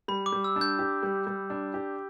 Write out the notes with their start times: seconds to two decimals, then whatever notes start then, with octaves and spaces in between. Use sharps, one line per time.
0.08 G3 B5
0.26 D6
0.32 G3
0.44 E6
0.56 D4
0.61 G6
0.79 G4
1.03 G3
1.27 G3
1.50 D4
1.74 G4